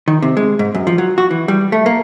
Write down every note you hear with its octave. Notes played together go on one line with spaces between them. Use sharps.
D#3
C3
G#3
G#2
F#2
F3
F#3
F#4
E3
G3
A3
A#3